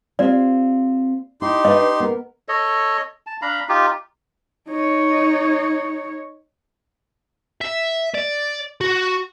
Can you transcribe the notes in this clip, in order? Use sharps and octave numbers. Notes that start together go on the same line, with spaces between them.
C4 F4 G4 D5
D#4 E4 G4 C6
D4 B4 D#5 E5
B3 A#4
A4 C#5 D#5
A5
D4 F5 A#5 B5
D#4 F4 G4
D#4 C#5
E5
D5
F#4